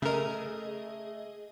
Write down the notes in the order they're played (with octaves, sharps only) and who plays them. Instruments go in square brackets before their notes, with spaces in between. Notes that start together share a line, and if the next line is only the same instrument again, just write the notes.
[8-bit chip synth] C#3 A#4 [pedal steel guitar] A3 [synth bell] G#4 D#5